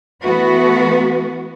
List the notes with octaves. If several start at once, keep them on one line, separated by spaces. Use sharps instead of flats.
E3 A3 B3 F#4 B4